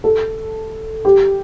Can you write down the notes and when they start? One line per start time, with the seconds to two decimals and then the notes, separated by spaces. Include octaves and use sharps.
0.04 A4
1.05 G4